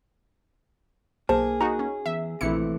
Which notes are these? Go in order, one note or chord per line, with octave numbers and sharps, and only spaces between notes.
B1 A#3 G#4 C5 A5
D#4 F#4 A#5
C#4
E2 E5
A#1 C3 E3 A3 E4 C#7